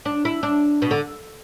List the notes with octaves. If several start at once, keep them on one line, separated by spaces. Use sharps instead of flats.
D4
E4
D4
B2
D3